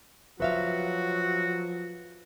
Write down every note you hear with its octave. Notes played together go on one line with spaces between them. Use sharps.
F3 F#3 F#4 B4 E5 F5